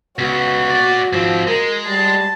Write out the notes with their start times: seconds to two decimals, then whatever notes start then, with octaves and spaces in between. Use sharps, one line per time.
0.19 C#2 B3 F#4
0.70 A#3 D5
1.13 G#2 F3 C4
1.48 G#3 A#4
1.87 G3 A5